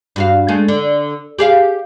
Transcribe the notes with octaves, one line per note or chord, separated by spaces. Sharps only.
G2 F#4 F5
G#3 A3
D3
G4 G#4 F5